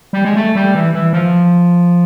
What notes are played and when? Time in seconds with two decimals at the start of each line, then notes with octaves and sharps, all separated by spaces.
0.13 G3
0.25 G#3
0.36 A3
0.55 G3
0.75 E3
0.94 E3
1.13 F3